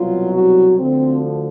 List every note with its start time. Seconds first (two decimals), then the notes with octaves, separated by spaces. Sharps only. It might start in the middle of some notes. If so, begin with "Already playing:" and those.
Already playing: C2 B2 F#3 F4
0.33 F#4
0.79 D2 D3 F3 C4